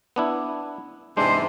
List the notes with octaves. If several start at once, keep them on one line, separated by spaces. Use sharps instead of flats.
B3 D4 E4
E2 G#2 C3 G#3 D4 C5